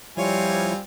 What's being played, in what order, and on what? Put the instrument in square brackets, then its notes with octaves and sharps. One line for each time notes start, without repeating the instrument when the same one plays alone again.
[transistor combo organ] F3 E4 [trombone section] G3 [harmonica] C4 F4 G#5 [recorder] C#5